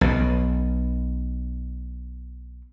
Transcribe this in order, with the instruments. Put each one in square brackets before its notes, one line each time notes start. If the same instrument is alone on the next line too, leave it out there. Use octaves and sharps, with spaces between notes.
[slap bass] B1 B2